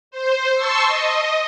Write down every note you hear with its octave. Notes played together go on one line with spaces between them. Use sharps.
C5
A5 C6 C#6 E6
D#5